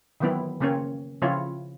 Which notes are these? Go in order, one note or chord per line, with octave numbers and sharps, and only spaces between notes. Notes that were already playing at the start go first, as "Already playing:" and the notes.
D#3 E3 F#3 B3 C4 E4
C#3 A#3 C4 C#4 C#5
C#3 F3 C4 E4 F4 C#5